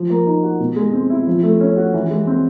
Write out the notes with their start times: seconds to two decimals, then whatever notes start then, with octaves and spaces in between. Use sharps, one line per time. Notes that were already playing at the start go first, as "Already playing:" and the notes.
Already playing: F3
0.10 A#3
0.26 D#4
0.43 F#4
0.59 B2
0.76 G#3
0.93 C4
1.10 E4
1.27 F3
1.43 A3
1.61 C#4
1.77 F#4
1.94 E3
2.11 G#3
2.27 C4